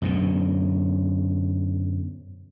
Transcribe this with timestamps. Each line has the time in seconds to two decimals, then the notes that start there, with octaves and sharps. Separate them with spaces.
0.02 F#2 B2 D3